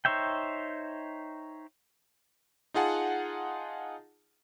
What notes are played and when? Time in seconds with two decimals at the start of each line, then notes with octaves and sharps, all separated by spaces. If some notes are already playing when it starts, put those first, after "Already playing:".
0.05 D#4 C5 C#5 E5 G5
2.74 D#4 F4 G#4 F#5 A5